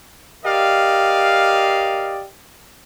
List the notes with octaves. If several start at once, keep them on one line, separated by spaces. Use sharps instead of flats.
G4 A#4 D5 D#5 F5